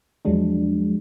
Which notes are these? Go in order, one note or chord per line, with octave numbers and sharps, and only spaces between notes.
E2 F3 F#3 G#3 D4